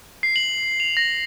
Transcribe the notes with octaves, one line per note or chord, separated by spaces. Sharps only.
C7
F#7
F7
A#6